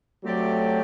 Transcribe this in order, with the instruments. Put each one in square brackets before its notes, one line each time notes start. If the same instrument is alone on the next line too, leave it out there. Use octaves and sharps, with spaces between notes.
[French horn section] F#3 A3 [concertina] C4 G4 D5 G5